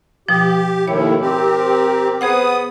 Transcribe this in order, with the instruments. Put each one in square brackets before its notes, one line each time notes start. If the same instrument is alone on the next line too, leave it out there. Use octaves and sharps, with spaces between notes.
[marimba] B2 F3 [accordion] G4
[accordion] D#2 A2 D#3 [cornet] E4 [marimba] C#5
[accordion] C4 G4 [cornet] A#4
[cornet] B3 [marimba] G#4 C5 F#5 [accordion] D#6